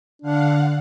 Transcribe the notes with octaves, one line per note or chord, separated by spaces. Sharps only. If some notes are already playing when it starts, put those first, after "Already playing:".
D3 D4 F5 F#5